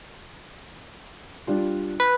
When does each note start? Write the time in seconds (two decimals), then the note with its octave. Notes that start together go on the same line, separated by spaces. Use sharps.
1.47 G3 D4 F4
2.00 B4